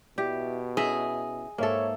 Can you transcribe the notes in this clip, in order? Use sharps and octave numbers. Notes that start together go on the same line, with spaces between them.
B2 E4 G4 D5
C#4 E4 G#4 D#5 E5
G#2 A#3 A4 C#5 E5